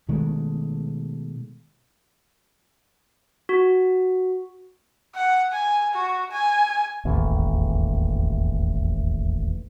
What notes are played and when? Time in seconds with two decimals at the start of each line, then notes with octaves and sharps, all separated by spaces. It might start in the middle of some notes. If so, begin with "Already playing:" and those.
0.09 B2 D#3 G#3 A3
3.49 F#4
5.15 F#5
5.52 G#5
5.94 F#4
6.32 G#5
7.05 E1 A1 D#2